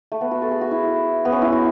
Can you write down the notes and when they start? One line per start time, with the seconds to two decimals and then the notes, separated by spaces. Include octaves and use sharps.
0.12 A3
0.21 B3
0.31 F#4
0.42 A4
0.51 G#4
0.61 F#4
0.71 E4
1.25 B3
1.32 C#4
1.42 E4
1.52 F#4